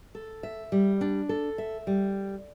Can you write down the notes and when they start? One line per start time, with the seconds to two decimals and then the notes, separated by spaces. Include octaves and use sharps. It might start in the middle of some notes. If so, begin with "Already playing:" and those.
0.15 A4
0.43 E5
0.72 G3
1.01 D4
1.29 A4
1.58 E5
1.87 G3